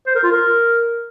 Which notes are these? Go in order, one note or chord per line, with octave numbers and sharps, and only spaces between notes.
C5
A#4
F4
A#4